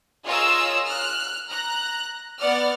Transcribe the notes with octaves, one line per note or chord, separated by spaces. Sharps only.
F4 G#4 A#4 C#5 D#5 E6
F6 F#6
A#5 F#6
B3 D5 F#5 F6